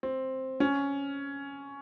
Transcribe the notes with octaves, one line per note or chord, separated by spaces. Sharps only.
C4
C#4